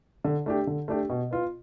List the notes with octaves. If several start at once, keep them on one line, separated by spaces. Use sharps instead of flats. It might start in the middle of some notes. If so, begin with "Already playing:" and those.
D3
A3 D4 G4
D3
A3 D4 G4
B2
B3 F4